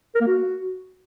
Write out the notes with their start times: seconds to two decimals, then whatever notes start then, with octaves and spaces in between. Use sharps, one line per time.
0.15 A#4
0.21 A#3
0.27 F#4